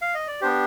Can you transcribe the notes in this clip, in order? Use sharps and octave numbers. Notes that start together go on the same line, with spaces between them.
F5
D#5
D5
B3 D4 G4 C5